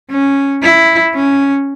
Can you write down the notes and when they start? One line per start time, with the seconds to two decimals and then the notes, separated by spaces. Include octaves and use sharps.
0.11 C#4
0.63 E4
1.15 C#4